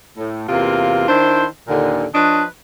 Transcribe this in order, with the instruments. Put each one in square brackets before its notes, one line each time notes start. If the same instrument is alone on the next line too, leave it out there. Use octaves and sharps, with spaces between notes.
[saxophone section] A2
E2 C3 A#3 F4
D#3 D4 E4 C5
D#2 A#2 D3
F3 D4 B4 C#5 D#5